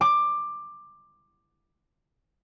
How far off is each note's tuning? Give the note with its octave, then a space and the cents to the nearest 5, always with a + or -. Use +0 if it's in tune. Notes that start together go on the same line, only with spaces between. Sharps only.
D6 +15